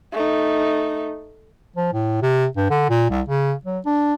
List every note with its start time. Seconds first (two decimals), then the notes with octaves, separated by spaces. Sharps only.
0.13 A3 D#4
1.76 F3
1.94 A2
2.22 C3
2.56 G2
2.70 D3
2.90 A#2
3.10 C2
3.29 C#3
3.65 F#3
3.86 D4